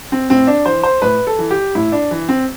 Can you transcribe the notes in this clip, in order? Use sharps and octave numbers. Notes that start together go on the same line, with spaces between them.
C4
A2 C4
D4
E3 C5
C5
A2 B4
A4
E3
G4
A2 E4
D4
E3
C4